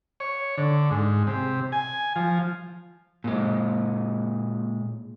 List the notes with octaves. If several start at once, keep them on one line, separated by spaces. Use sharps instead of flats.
C#5
D3
G#2
C3
G#5
F3
A#2 G#3